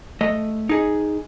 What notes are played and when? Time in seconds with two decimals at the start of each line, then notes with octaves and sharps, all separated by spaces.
0.21 A3 D#5
0.69 D#4 G#4